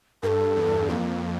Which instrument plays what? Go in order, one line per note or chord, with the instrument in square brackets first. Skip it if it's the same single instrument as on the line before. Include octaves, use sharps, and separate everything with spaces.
[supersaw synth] G2 [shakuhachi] A4 A#4
[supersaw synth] E2
[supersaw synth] F2 [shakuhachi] A#3